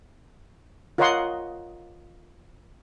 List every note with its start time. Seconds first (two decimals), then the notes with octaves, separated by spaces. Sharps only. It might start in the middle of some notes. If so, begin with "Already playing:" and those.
0.98 F4 A#4 C#5 D#5 F#5 C6